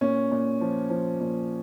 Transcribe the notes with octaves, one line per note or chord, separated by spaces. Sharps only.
A#2 C#4
A#2
F3
F3
A#2